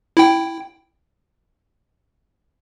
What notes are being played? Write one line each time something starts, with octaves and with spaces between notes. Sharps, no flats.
E4 G5